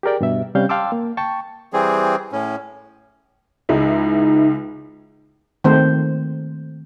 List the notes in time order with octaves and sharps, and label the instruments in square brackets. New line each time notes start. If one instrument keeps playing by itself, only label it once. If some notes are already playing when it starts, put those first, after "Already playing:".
[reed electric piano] G4 G#4 A#4 D5 G5
G2 B2 E5
C3 G3 C#4 F5 G6
F5 G5 A5 C6 D6 E6
A#3
G5 A5 C#6
[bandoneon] E3 G3 C4 G#4
A2 C#4
[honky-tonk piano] C#2 G#3 E4 [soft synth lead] D#4
[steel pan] D#3 A3 C4 C5